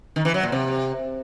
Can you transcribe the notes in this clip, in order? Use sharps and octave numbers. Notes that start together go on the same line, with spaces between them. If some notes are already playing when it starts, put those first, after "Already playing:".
D#3
E3
F#3
A#2
C3